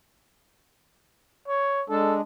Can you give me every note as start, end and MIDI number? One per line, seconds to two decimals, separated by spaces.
1.48 1.83 73
1.90 2.21 56
1.90 2.21 62
1.90 2.15 69